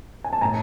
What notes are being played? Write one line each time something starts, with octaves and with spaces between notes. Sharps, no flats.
G#5
A5
A2 G#5 A#5